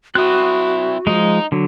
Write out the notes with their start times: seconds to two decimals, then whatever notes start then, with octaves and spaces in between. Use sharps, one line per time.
0.15 C4 E4 F#4 D#6 F#6
1.07 F3 G#3 D#4
1.52 D3 F#3